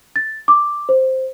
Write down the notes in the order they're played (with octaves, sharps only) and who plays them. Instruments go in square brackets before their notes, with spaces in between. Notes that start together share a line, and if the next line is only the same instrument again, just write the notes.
[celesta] A6
D6
C5